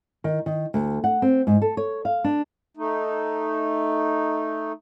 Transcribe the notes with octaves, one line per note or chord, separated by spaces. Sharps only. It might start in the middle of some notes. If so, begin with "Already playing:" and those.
D#3
D#3
D2
F#5
C4
G#2
A4
C#5
F5
D4
A3 D#4